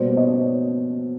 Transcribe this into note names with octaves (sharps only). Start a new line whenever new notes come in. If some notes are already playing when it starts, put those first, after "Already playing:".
Already playing: B2 G3 A#3 C5 D5
C#5 D#5